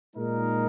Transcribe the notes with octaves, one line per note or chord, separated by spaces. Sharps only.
A#2 G#3 D#4 A#4